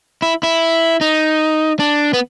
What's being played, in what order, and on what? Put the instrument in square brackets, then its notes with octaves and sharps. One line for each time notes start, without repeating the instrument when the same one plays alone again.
[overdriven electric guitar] E4
E4
D#4
D4
B3